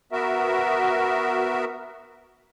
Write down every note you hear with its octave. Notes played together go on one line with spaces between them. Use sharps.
B3 F#4 A#4 E5